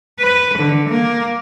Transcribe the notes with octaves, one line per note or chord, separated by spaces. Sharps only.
B4
D3
A#3